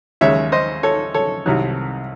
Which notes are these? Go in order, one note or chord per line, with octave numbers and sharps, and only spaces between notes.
D#2 C#3 G#3 C#5 E5
C5 D#5
A4 C#5
A4 C#5
C2 C3 D#3 F#3